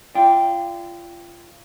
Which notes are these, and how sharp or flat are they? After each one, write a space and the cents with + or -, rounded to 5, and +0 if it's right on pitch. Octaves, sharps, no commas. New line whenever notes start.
F4 -30 D5 +0 G5 +0